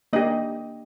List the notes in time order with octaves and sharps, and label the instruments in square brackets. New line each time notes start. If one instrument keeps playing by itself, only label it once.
[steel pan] A#3 D4 G4 D#5